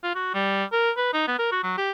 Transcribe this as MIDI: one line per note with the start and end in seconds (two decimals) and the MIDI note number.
0.03 0.11 65
0.15 0.33 66
0.34 0.64 55
0.72 0.91 70
0.97 1.12 71
1.13 1.23 63
1.28 1.34 59
1.39 1.49 70
1.52 1.61 66
1.63 1.76 54
1.78 1.91 67